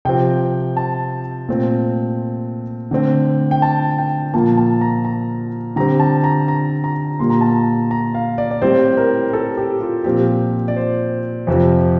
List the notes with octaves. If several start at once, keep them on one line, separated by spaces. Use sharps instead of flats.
C3 F3 C4 G5
A5
A#2 A3 C4
D3 A3 C4
G5
A5
G5
A#2 F3 A#3 A5
A5
A#5
A#5
D3 G3 C4 A#5
A5
A#5
A#5
A#5
A#2 G3 A#3 C6
A#5
A5
A#5
A#5
F5
D5
D5
A2 G3 C4 C5
A#4
A4
G4
F4
A#2 F3 C4 G4
D5
C5
F2 C3 F3 C4